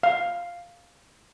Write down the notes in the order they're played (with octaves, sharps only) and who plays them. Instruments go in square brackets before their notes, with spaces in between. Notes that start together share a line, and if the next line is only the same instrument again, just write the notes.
[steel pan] F5